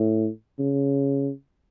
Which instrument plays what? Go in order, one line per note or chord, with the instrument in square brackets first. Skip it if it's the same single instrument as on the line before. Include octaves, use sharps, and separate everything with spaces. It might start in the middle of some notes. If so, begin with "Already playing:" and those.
Already playing: [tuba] A2
C#3